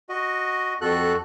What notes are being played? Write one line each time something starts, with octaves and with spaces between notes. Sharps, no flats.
F#4 D#5
F2 F#4 A4 F#6